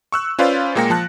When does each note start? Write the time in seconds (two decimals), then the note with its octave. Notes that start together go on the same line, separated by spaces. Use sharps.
0.12 C#6 E6 F#6
0.39 C#4 F4 B4 C5 D5 F5
0.75 A#2 G#3 A#3 G5 A#6 C#7
0.90 F3 A5 F#6